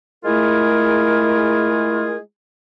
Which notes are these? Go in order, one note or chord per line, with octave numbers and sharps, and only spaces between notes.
G#3 A3 E4 F4 G#4 A#4